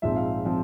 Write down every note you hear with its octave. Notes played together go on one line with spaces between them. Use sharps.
A#1 G#2 F3 C4 E5
F5
F3 C4